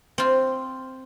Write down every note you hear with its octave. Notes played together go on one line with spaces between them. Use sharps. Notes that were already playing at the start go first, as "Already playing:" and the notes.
C4 F4